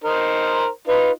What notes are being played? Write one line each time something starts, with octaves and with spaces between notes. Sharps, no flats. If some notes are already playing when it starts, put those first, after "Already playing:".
D#4 A#4 C5
D#4 F4 B4